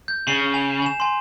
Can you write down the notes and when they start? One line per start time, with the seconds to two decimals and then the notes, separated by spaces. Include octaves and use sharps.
0.08 G6
0.28 C#3 C7
0.54 G#5 F7
0.82 G#5 E7
1.00 G#5 C6